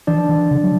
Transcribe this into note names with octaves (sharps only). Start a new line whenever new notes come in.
E3 D4 D5
E3
C#3
F#3